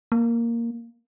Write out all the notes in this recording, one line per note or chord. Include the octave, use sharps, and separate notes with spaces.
A#3